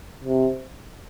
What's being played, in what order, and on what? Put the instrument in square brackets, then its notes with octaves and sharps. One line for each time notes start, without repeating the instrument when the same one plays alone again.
[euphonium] C3